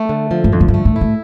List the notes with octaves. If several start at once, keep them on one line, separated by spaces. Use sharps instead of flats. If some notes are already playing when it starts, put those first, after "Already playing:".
Already playing: A3
D3
F3
G2
F2 D3
A2
G2
A3
A2
E4
A2